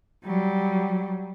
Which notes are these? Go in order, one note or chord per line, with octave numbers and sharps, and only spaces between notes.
F#3 G3